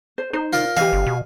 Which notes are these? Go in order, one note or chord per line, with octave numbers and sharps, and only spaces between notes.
C5
D#4 C5
F4 A#4 D5
E3 G4 D#5 F5 G#5
G1
B2